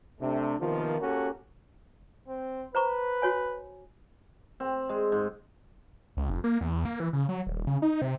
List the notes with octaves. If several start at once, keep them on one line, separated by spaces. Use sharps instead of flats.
C3 A3 D4
C3 D#3 F3 A#3 B3 F4
A#3 C#4 F#4 G4 A4
C4
B4 C5 A#5 C#6
F#4 C#5 G#5
C4
G#3
G#2
C#2
F1
A#3
E2
A#3
E3
C#3
F#3
D#1
C#3
D#4
C3